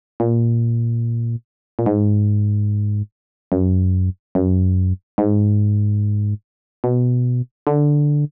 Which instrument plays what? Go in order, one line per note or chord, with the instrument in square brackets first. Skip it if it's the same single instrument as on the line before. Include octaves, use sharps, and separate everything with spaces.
[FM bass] A#2
A#2
G#2
F#2
F#2
G#2
B2
D3